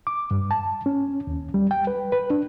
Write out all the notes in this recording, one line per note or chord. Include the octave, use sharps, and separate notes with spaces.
D6
G2
A5
C#4
D#2
G3
G5
B4
B4
D4